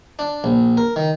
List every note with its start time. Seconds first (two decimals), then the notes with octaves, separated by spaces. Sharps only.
0.19 D4
0.44 A#1
0.77 A#4
0.96 D#3